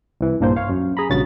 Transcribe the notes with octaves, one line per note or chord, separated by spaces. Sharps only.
C2 E3
A#1 G2 A#3 C5
C#5 F5
F#2
G#4 A#5 B5
A#1 G2 C#3 F#4 A6